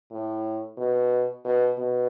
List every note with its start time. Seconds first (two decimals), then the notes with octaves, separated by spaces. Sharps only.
0.11 A2
0.78 B2
1.45 B2
1.78 B2